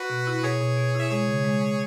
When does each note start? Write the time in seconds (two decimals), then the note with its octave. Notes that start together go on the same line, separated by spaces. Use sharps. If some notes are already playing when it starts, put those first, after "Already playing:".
Already playing: F#4 B4
0.10 B2
0.27 E4
0.43 B2 G#4 C#5
0.61 B2
0.77 B2
0.95 E4 E5
1.11 G#3 G#4 C#5
1.27 C#3
1.44 G#3
1.61 G#3